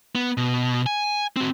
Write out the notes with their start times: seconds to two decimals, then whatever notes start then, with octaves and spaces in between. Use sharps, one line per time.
0.15 B3
0.37 B2
0.86 G#5
1.36 C4 F#4